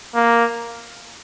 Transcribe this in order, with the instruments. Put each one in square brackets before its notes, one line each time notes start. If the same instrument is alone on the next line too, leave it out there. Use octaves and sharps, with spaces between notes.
[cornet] A#3